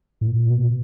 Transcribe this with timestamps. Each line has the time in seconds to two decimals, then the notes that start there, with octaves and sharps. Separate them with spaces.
0.21 A2
0.27 A#2
0.50 B2